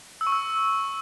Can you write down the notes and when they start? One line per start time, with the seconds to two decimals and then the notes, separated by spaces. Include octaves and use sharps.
0.21 E6
0.27 C#6
0.32 E6